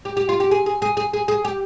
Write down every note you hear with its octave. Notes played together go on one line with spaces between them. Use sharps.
G4
G4
F4
G4
G#4
G#4
G#4
G#4
G#4
G#4
G4